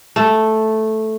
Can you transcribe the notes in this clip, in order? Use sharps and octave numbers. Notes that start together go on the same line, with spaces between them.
A3